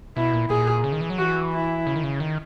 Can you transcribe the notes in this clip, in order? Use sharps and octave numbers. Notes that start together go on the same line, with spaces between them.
B2 E4
A#2
A#2 G#4
C#3
D#3
E3
F#3
E3 F#4
E4
C#3
D#3
C#3
D#3